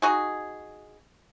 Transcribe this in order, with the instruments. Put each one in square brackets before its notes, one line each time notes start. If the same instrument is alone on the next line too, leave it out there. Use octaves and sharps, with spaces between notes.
[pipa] D#4 F#4 G#4